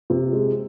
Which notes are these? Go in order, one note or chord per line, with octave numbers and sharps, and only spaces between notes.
C3
G#3